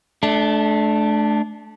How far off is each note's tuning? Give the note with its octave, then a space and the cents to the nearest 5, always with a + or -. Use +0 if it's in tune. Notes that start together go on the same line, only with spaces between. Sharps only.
A3 -30 D4 +5